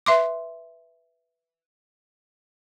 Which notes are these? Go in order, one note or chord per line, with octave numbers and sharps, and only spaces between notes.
B4 E5 C6 D6